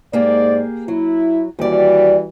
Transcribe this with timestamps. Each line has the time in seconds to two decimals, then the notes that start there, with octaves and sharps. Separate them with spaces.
0.13 G#2 A#3 G4 G#4 D5
0.88 F#3 E4
1.59 D#2 E3 G3 F#4 D5